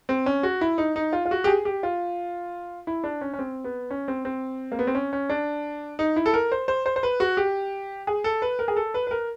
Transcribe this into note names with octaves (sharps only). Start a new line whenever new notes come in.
C4
C#4
F#4
E4
D#4
D#4
F4
F4
F#4
G4
G#4
G4
F4
E4
D4
C#4
C#4
C4
B3
C#4
C4
C4
A#3
B3
C4
C#4
C#4
D4
D#4
E4
A4
A#4
C5
C5
C5
C5
B4
F#4
G4
G#4
A4
B4
A#4
G#4
A4
B4
B4
A#4